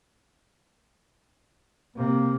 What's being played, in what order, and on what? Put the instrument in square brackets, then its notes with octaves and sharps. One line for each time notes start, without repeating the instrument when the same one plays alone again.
[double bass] C3 [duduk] A#3